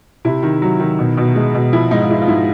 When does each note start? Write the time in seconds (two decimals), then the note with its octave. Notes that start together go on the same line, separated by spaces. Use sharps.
0.25 C3 E4
0.43 D#3
0.62 F#3
0.80 D#3
0.99 B2
1.17 B2
1.36 G#3
1.55 B2
1.73 F3 E4
1.91 G#2 D#4
2.04 F4
2.09 G#3 E4
2.22 F4
2.28 G#2 E4